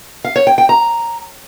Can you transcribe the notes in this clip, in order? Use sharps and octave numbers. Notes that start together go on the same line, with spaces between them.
F5
C#5
G5
G5
A#5